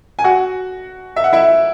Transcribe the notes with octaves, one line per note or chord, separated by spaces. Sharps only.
G#5
F#4 F#5
E5
F#5
E4 E5